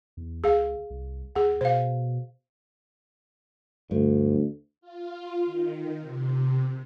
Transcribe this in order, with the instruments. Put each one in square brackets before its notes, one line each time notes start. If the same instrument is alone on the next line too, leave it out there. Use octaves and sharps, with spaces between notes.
[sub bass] E2
[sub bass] C#2 [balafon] G#4 F5
[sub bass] C2
[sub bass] D#2 [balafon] G#4 F#5
[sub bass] B2 [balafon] C5 F5
[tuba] D2 [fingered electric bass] G2
[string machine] F4
D#3
C3